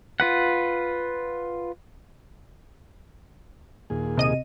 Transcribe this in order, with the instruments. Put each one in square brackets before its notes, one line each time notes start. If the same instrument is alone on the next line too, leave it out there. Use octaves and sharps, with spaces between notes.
[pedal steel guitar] F4 B4 F#5
[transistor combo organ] D#2 A#2 G#4
[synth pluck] C3 D#5 D#7